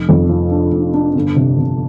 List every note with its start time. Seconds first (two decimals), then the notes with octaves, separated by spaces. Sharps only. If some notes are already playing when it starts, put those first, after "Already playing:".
Already playing: F1
0.09 F2
0.29 F3
0.52 D4
0.72 F1
0.94 D4
1.15 G1
1.36 C3
1.58 C3